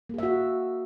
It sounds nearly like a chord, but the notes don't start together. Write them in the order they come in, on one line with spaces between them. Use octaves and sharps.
A#3 G#4 E5 F#4